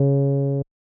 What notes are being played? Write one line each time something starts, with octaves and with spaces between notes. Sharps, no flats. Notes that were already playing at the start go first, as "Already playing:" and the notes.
Already playing: C#3